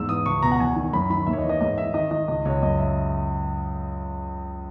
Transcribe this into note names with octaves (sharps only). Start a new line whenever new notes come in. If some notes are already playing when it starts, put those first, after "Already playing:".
Already playing: E2 G#2 E6
E3 D#6
C#2 C#6
B2 A#5
F#5
E2 G#5
D#3
F#2 B5
D#3 B5
D#2 E5
C#5
D#5
E3
D#5
G#2 D#5
G#2 E5
D#3 D#5
D#3 D#5
C#2 D#5
C#2 C#5
F#2 D#5
E5